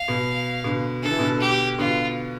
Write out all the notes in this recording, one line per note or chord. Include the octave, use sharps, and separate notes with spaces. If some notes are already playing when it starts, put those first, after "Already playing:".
Already playing: F5
B2
B2 D3
D3 A4
E3
B2 D3
G4
B2 D3 F4